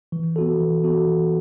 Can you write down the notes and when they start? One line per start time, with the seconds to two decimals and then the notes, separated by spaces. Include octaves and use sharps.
0.12 E3
0.36 B3 F#4 A4
0.60 E3
0.84 B3 F#4 A4
1.07 E3